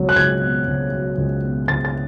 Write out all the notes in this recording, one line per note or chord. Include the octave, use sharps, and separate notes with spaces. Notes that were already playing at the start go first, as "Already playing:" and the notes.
Already playing: C#2 B2 F#3
F#6
C#2 G#6
B2
C#2
F#3
C#2
B2
C#2 A6
A6